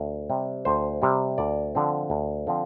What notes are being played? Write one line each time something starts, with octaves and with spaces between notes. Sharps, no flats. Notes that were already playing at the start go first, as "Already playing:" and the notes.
Already playing: D2
C3 G3
D2 C5
C3 G3
D2 D5
D3 F3 C4
D2
D3 F3 C4